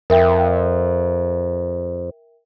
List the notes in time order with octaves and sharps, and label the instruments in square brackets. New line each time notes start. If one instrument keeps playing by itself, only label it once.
[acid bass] F2 [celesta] A#4 E5 G5